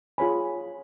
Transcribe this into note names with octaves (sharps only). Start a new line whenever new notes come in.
F4 G#4 C#5 G#5 B5